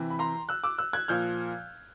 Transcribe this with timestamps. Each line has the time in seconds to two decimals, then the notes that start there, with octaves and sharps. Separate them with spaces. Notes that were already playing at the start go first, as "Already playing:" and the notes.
Already playing: C3 E3
0.10 B5
0.19 A#5 C6
0.49 E6 F#6
0.64 D6 E6
0.78 E6 F#6
0.93 F#6 G#6
1.08 A#2 F3 F6 G6